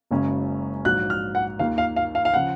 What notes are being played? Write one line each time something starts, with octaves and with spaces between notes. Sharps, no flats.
F#1 F#2 C#3 G#3 C#4
A#1 G#2 F#3 F#6
F6
F#5
D#2 D#3 A#3 F4 F5
F5
F5
F5
F5
C#3 F3 F#5